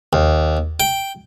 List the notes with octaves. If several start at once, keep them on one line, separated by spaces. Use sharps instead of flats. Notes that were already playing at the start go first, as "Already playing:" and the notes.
D#2
G5